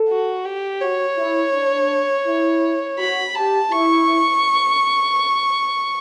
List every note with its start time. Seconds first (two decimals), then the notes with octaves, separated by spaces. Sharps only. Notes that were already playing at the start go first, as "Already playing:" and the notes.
Already playing: A4
0.09 F#4
0.45 G4
0.81 F#4 C#5
1.18 E4
1.54 D4
2.26 E4
2.98 F#4 B5
3.35 G4 A5
3.71 E4 C#6